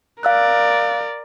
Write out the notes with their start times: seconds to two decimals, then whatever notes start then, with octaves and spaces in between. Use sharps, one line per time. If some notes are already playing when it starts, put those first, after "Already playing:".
0.23 A#4 D5 F5 E6 F#6